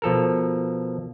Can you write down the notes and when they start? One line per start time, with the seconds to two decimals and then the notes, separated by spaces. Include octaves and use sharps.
0.02 B2 F3 A4 A#4